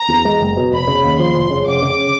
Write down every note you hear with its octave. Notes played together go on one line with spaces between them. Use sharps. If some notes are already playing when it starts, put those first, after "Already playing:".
Already playing: A#5
E2
G#3
F#1
B2
F1 B5
C#3
D#2
F3 C6
F1
C#3
F1 D6
C#3